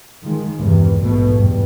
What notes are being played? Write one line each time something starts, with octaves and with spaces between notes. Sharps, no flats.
D#3 F3 G#3
E2 G2 C3
A#1 G#2 B2 A3
E2 G2